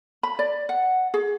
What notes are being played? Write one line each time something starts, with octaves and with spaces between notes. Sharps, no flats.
B5
D5
F#5
G#4